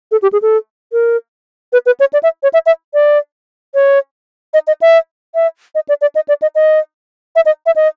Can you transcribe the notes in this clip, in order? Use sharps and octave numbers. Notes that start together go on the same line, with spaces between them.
A4
G4
G#4
A4
A#4
B4
B4
C#5
D5
E5
C#5
E5
E5
D5
C#5
D#5
D#5
E5
E5
D#5
D5
D5
D#5
D5
D#5
D#5
E5
D#5
E5
D#5